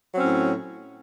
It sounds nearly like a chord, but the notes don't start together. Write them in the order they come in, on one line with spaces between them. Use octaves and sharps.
F#3 C4 C#4 A2